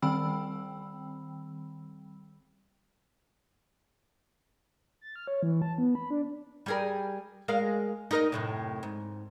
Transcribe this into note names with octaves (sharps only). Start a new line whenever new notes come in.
D#3 G3 C4 G5 B5 E6
A6
F6
C#5
E3
A5
B3
B5
D4
G3 G#4 A#4
G#3 A#4 F5
D#4 A#4 D#5
F#2 A2 C3
G#2